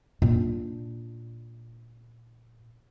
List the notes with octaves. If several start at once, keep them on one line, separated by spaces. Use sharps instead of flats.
A#2 D4